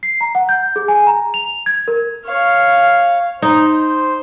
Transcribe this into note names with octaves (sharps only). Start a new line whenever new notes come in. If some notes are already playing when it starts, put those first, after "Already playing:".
C7
A#5
F#5
G6
G#4
G#5
A#5
F7
G#6
A#4
C#5 F5
D#4 C5